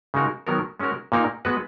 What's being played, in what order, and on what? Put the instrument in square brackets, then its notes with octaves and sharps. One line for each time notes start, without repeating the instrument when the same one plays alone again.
[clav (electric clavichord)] C#3 G#3 D#4 F#4 A#4
D#3 F#3 B3 F#4 A#4
G#3 C#4 F#4 A#4
A#2 A#3 D#4 A#4
G#3 B3 F#4 B4